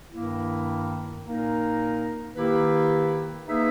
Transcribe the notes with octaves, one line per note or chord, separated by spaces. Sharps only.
G2 D#3 A#3 E4
A#2 A#3 D#4 A#4
D#3 A#3 E4 G4 B4
A#3 D#4 G#4 B4 E5